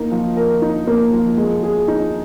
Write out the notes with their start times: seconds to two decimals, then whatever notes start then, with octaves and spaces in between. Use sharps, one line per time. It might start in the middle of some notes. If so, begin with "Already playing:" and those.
Already playing: A#3 D#4
0.11 F3
0.37 A#4
0.62 D#4
0.87 A#3
1.12 F3
1.37 G#3
1.63 G#4
1.88 D#4